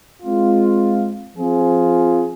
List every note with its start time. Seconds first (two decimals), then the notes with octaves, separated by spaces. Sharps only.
0.22 G#3 C4 F4
1.38 F3 C4 F4 G#4